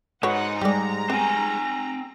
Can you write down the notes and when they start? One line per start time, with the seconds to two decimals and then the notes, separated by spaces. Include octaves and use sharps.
0.23 G#2 D#4 F#4 B4 C#5 F#5
0.61 G3 G#3 G4 D5 A#5
1.10 B3 C4 G#5